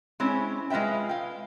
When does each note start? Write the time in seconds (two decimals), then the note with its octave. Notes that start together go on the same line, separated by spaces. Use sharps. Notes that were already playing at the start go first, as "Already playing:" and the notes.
0.20 G#3 C4 C#4 E4
0.70 G#3 F4 B4 E5 G5
1.09 F5 G5